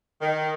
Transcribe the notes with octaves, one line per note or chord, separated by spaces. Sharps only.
D#3